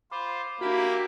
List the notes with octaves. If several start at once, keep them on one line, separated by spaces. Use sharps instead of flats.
F4 C5 B5 D6
A#3 D4 E4 F#4 G4 B5